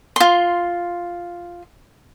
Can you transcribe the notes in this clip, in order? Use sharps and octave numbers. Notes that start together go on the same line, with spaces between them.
F4 C6